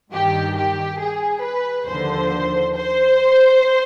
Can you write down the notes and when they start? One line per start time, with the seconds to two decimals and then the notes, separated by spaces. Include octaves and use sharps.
0.12 G2 D#3 G4
0.56 G4
1.00 G#4
1.43 B4
1.88 D#2 D3 F3 C5
2.76 C5